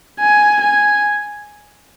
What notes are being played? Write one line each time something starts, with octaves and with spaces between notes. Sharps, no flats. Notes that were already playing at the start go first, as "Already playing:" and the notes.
G#5
G#5